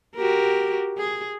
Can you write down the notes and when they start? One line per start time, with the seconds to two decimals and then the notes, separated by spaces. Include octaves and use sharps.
0.16 F#4 G4 A#4
0.97 G#4